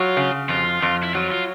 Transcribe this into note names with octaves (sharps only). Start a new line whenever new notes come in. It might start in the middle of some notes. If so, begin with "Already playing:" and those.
Already playing: F#3 F4
C#3
F2 F4
F2
E4
F#3 F4
F4